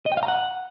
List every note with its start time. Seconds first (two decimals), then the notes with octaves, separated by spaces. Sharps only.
0.06 D#5
0.12 G5
0.17 F5
0.23 A#5
0.28 F#5